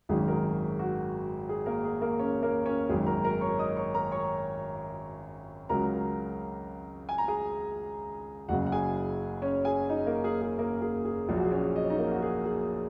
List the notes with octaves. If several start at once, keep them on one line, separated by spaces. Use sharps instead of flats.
G#1 F#2 D#3 F#3 G#4
A#4
G#4
F#4
G#4
A#3 A#4
G#4
A#3 A#4
C#4 C#5
A#3 A#4
C#4 C#5
G#1 F#2 D#3 G#4
A#4 A#5
A#4 A#5
C#5 C#6
D#5 D#6
C#5 C#6
A#4 A#5
C#5 C#6
C#2 C#3 F#3 A#4 A#5
G#5
A#5
G#4 G#5
F#1 F#2 C#3 F#3 F#4 F#5
F#5
G#4 G#5
C#4 C#5
G#4 G#5
D#4 D#5
A#3 A#4
G#4
G#4
A#3 A#4
G#4
G#4
A#1 A#2 F#3 G#4
F#4
G#4
C#4 C#5
D#5
C#5
D#4 D#5
A#3 A#4
F#4
G#4
G#4